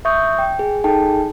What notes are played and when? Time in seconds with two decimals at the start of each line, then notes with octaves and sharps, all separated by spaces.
0.05 E5 C#6 D#6 G6
0.39 G5
0.59 G#4
0.84 D#4 G#4 A4 G5 A5